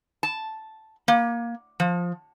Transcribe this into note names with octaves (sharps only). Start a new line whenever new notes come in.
A5
A#3
F3